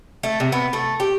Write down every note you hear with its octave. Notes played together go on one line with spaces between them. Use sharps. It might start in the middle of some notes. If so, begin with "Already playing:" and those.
A3
C3
B3
A3
G4